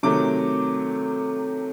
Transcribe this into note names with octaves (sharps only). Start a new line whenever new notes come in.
C3 D#3 F#3 A3 D6